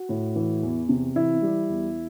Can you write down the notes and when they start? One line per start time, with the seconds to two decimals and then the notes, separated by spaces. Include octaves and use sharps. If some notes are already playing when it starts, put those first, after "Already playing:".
Already playing: F#4
0.09 A2
0.36 E3
0.63 E2
0.89 C3
1.16 E3 E4
1.42 G3
1.69 E2